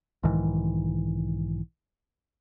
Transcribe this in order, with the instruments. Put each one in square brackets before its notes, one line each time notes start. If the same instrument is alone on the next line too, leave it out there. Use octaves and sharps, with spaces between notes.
[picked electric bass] B1 G#2 D#3 E3